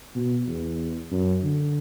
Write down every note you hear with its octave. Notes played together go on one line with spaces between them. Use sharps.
B2
E2
F#2
D3